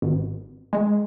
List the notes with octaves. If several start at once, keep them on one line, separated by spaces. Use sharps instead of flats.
G#1
G#3